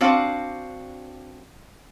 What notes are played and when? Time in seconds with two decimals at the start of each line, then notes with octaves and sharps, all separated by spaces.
0.01 C4 D4 F#4 F5